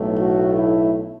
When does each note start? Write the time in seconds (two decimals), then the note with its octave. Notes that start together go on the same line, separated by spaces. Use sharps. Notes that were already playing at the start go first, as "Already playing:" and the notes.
Already playing: B1 A2 A3
0.18 F#4
0.56 E4